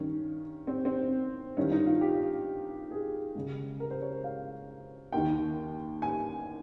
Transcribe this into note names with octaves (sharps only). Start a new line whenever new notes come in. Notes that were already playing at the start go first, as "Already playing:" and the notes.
Already playing: G2 D#3 C#4
C4
C4
G2 D#3 C#4
D#4
F4
G4
G#4
C#2 C#3
A#4
C5
C#5
F5
D#2 D#3 G5
G#5